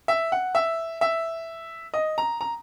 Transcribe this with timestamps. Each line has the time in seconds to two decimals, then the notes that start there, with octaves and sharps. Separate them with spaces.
0.08 E5
0.32 F#5
0.55 E5
1.01 E5
1.94 D#5
2.18 A#5
2.41 A#5